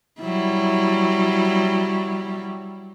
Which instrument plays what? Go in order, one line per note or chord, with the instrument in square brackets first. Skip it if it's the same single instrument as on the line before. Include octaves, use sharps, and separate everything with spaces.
[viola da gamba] F#3 G3 E4